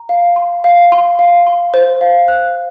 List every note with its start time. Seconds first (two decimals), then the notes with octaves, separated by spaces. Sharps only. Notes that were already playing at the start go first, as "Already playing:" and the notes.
Already playing: A#5
0.09 F5
0.36 C6
0.64 F5
0.92 C6
1.19 F5
1.47 C6
1.74 C5
2.01 F5
2.28 F#6